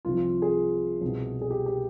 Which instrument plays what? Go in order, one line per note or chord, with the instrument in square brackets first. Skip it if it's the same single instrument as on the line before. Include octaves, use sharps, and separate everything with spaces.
[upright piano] C2 C3 F3 F4
F4
G#4
C2 B2
G#4
G4
G4